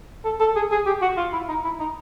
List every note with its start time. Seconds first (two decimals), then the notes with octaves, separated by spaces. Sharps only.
0.25 A4
0.40 A4
0.56 G#4
0.71 G#4
0.86 G4
1.02 F#4
1.17 F4
1.33 E4
1.48 D#4
1.64 E4
1.80 D#4